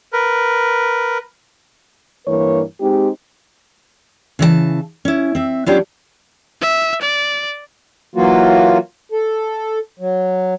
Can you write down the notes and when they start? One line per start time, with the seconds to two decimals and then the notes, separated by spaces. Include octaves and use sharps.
0.13 A#4 B4
2.26 G2 E3 A#3 B4 C#5
2.81 G#3 C4 D#4 G4
4.39 C#3 E3 C#5 A5
5.05 C#4 E4
5.35 C4 E5
5.66 F#3 B3 C#4 D4 F4 G4
6.61 E5
7.01 D5
8.16 E3 F#3 A#3 F4 F#4
9.12 A4
10.00 F#3